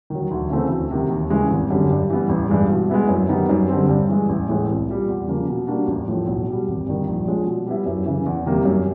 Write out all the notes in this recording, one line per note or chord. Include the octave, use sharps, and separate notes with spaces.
D#3 F#3
D2
C#3 E3 A3 C4
D2
C3 D#3
D#2
C#3 E3 G#3
G#1
F#2 D3 G3
G2
E3 G3 B3
A1
G2 E3 G#3
B2
G#3 B3 E4
F#2
D#3 G3 B3 D#4
F#2
D3 G3 C4
G2
E3 G#3
A1
A2 E3 G#3
C2
A#2 G3
E2
C#3 F3 A#3
B2
G3 A#3 D4 F#4
A1
A2 F3
B1
B2 G3
G#1
G2 D#3
A#1
A#2 F3 G#3 C#4
B2
G3 B3 E4
F#2
C#3 E3
E2
C3 D#3 G3 A#3
F#2